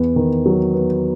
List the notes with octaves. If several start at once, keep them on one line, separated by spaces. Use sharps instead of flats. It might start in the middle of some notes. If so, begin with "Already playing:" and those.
Already playing: E2 B3
D#3
F#3
B3